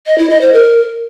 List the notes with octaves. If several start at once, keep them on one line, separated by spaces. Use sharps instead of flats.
D#5
E4
D#5
C5
A#4